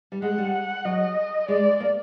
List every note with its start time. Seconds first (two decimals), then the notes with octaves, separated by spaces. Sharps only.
0.12 G3
0.22 G#3 F#5
0.38 G3
0.54 F#5
0.85 F#3 D#5
1.48 G#3 D5
1.80 A#3